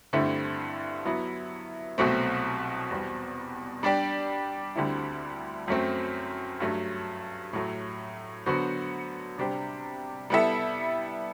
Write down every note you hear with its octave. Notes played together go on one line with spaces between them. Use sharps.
G2 D3 A3 C4 E4
F#3 B3 E4
C2 B2 F#3 A3 C4
E2 B2 G3 C4
G3 D4 G4 D5
D2 D3 G3 C4 E4
F#2 F#3 A3 C4
G2 F#3 A3
A2 F#3 A3
D3 F#3 B3 F#4 C5
C3 G3 D4 G4 C5
G3 B3 E4 A4 E5